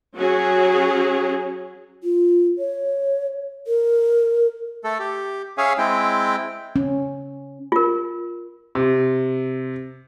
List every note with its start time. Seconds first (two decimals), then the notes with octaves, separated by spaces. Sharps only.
0.16 F#3 C#4 F#4 G#4
2.04 F4
2.58 C#5
3.67 A#4
4.84 A3 A4
5.00 G4
5.58 C#4 G#4 C#5 E5 F5 G#5
5.78 G#3 C4 E4 G5
6.76 C#4
7.72 F4 A#4
8.75 C3